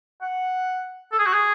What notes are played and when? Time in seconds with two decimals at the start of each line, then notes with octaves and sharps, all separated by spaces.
0.22 F#5
1.12 A4
1.19 G#4
1.27 F#4
1.34 G#4